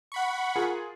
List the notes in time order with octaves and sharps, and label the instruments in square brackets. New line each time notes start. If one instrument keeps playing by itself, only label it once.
[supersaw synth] F#5 B5 C#6
[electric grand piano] F4 G#4 A#4